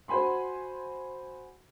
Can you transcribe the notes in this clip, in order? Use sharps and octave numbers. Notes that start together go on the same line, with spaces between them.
F#4 C5 G#5 B5 C6